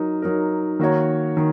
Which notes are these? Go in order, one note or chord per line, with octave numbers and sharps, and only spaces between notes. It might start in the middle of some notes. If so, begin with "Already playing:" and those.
Already playing: F#3 D#4 A#4
F#3 D#4 A#4
D#3 A#3 F#4 A#4 C#5
D#3